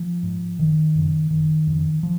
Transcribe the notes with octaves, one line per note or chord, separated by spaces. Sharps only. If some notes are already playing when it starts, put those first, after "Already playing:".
Already playing: F3
G#2
F#1 D#3
F#2 C#3
F#1 D#3
F2 C#3
F3